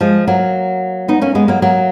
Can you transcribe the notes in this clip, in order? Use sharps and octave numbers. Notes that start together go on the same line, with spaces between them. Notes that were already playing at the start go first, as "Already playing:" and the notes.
F3 G#3
F#3 A#3
B3 D#4
A#3 C#4
G#3 B3
F#3 A#3
F#3 A#3